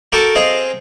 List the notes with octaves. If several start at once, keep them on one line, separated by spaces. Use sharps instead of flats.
F#4 A4 A#4 G5 A5 D6
C4 G#4 C5 D#5 F5